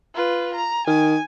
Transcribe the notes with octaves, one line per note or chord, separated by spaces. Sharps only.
F4 B4
A#5
D#3 G#5